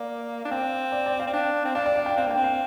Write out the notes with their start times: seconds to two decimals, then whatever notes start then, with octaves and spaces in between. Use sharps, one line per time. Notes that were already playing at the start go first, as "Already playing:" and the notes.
Already playing: A#3 D5
0.45 D4
0.51 C4 F5
0.92 D5
1.06 D5
1.20 F5
1.27 C4
1.33 D4
1.65 C4
1.75 D4 F5
1.86 D5
1.96 F5
2.06 G5
2.17 C4 F5
2.27 A#3 G5
2.38 C4
2.44 F5